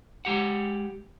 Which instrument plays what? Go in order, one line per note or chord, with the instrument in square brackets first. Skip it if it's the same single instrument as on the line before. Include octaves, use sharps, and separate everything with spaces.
[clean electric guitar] G#3 G4 F#5